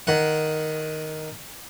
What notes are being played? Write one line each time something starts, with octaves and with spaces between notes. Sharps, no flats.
D#3 F#5